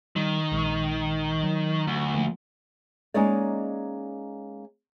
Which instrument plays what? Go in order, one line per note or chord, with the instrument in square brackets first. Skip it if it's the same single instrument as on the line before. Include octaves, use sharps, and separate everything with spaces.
[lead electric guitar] D#3 [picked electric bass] G3
[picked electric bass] A#1 G#3
F#3
[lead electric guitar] D2
[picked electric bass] F3 A3 A#3
[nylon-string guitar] G#3 A#3 C#4 D#4 C#5 D5